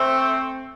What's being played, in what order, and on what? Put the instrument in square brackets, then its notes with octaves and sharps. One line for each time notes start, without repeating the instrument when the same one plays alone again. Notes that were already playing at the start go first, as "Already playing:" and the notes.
Already playing: [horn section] A3 C4